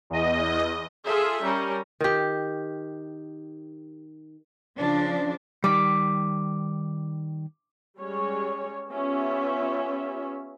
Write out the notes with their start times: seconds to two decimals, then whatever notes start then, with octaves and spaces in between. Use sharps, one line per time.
0.10 E2 D#5
1.05 F4 G#4 A4 E5
1.42 G3 C#4 A#4
2.01 D#3 G4
4.77 C#3 F3 D4
5.64 D#3 G3 D6 B6
7.99 G3 G#3 C#4 C#5
8.91 B3 C#4 F4 G4 E5